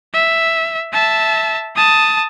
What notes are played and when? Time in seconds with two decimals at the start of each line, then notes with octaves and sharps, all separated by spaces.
0.13 E5
0.93 E5 A5
1.75 A5 D#6